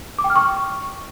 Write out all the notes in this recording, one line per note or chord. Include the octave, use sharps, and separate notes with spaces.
D6
G5
F6
C#6